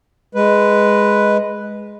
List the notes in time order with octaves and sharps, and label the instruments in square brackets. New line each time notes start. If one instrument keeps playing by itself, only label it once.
[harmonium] G#3 B4